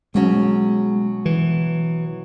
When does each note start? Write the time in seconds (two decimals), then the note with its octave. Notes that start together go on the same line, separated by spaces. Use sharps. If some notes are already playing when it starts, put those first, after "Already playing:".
0.14 B2 F#3 G#3 C#4 F#4
1.25 E3